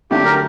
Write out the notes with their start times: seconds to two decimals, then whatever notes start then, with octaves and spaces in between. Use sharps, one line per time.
0.10 D3 F#3 A3 D4 G4
0.25 A#4